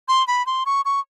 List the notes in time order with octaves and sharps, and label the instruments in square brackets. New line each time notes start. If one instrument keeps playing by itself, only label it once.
[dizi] C6
B5
C6
C#6
C#6